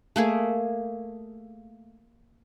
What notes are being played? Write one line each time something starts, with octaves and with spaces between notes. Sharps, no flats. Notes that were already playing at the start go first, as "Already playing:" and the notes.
A3 A#3 G#4